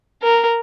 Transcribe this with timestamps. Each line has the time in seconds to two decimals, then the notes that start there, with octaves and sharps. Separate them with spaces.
0.23 A#4